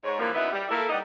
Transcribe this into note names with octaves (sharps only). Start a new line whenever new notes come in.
G#2 C#5
D3 E3 F3 G3 A#3
F#2 B3 D#4 E4 B4 E5
G3
A#3 E4 A4
G2 G3 D#4 D5 D#5 F#5